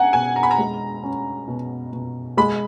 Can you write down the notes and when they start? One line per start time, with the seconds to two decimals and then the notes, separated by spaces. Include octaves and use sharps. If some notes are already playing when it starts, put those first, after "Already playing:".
Already playing: C#4 F#5 G#5 A#5
0.13 B2 G#5
0.36 A#5
0.43 B5
0.51 A#5
0.58 G#3
1.03 C#4
1.48 B2
1.92 B2
2.37 G#3 B5